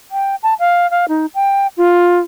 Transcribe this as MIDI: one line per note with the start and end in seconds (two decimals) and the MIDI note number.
0.11 0.35 79
0.43 0.54 81
0.59 0.89 77
0.91 1.05 77
1.09 1.26 63
1.35 1.67 79
1.77 2.20 65